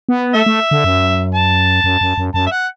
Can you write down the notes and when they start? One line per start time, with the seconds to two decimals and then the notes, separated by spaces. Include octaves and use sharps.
0.09 B3
0.34 A3 A4 E5
0.46 A3
0.71 D3
0.84 F#2
1.35 A5
1.84 F#2
2.01 F#2
2.18 F#2
2.34 F#2 A5
2.46 E5
2.51 F#5